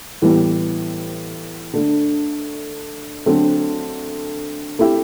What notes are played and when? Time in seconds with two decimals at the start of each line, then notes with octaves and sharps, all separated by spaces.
0.22 A2 E3 G3 B3
1.73 D3 A3 D4
3.26 D3 F#3 A3 C4
4.79 A3 C4 E4 G4